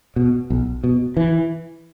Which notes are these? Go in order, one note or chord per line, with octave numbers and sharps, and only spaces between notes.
B2
B1
B2
E3